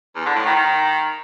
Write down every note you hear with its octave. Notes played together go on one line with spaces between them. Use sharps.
E2
D3
A2
D#3
D#3